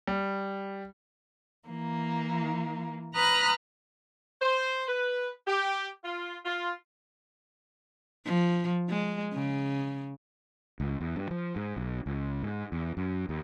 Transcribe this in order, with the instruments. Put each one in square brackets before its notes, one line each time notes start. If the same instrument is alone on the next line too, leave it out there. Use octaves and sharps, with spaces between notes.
[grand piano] G3
[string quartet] E3 A#3
B4 A#5 B5 D#6 F6 F#6
[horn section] C5
B4
G4
F4
F4
[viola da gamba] F3
G#3
C#3
[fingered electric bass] C#2
E2
G2
F3
G#2
B1
C#2
G#2
E2
F#2
D#2